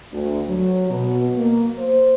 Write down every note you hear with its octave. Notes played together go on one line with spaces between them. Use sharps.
D2
F#3
B2
A#3
C5